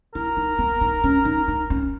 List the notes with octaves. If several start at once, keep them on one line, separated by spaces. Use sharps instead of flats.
E4 A#4
D#4
B3
D#4
C#4
D#4
D#4
C#4